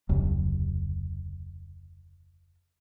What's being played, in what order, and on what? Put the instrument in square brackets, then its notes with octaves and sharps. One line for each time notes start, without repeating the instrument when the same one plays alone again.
[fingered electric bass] F1 D2 C#3 F#3